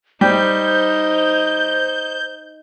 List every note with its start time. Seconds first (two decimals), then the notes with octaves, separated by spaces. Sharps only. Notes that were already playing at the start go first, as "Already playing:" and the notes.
0.21 G3 D#4 C5 G6